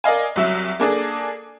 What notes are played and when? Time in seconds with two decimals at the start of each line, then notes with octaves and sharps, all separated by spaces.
0.04 A#4 D5 D#5 F5 G#5
0.36 C2 F#3 E5
0.80 A#3 D4 G#4 A4